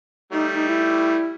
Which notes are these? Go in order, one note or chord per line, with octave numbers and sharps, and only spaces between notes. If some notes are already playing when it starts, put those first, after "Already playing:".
G3 A3 D#4
D#4
E4